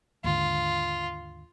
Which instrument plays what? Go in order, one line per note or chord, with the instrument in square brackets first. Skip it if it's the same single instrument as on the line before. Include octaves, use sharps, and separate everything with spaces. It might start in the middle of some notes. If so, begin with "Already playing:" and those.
[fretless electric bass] D#2 G#2 D3 [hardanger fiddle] F4